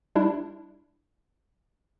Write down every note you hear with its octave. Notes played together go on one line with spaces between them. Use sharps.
G3 D4 E4